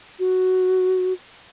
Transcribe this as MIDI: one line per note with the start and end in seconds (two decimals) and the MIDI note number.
0.19 1.13 66